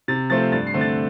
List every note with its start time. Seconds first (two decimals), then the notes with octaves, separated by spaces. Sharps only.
0.08 C3 A6
0.30 F3 A3 C4 A6
0.52 G2 A6
0.67 C7
0.74 D3 A3 C4
0.81 A6